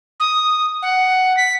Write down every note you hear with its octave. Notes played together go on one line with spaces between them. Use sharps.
D#6
F#5
B6